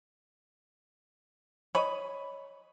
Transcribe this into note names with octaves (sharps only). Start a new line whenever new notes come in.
C#5 D#5 B5